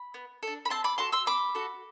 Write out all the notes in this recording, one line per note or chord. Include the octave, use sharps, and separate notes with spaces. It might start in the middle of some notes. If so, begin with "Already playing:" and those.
Already playing: B5
B3
D4 A4
B5
C4 A5 C6
B5 D6
F#4 A4 A5 C6
C6 E6
C4 B5 D6
F#4 A4